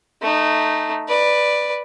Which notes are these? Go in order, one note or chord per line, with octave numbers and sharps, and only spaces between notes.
A3 D#4
B4 D5